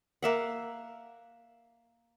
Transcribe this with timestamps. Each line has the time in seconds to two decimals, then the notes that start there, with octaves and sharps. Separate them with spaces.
0.23 A#3 E5 F#5